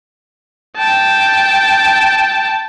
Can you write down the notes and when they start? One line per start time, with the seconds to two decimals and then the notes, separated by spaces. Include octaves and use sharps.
0.77 G5 A5